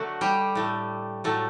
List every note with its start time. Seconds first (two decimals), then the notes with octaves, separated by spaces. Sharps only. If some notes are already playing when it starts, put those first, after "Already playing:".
Already playing: D3 F#3 A3 F#4
0.21 G3 G4
0.55 A2 A3
1.24 A2 F#3 A3